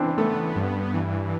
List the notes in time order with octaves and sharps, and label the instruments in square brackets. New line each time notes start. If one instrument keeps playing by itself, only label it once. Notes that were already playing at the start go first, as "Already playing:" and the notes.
Already playing: [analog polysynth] E3 [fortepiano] C4 D4 E4
[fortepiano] A3 [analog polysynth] B3
[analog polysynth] G2
E3